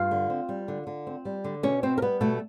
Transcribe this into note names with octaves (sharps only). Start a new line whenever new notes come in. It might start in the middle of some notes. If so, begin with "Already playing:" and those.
Already playing: G2 F4 F5
D3
C4
G3
D3
D3
C4
G3
D3
B2 C#4 C#5
B3 C4 C5
A#4
G3 B3 B4
B2 A3 A4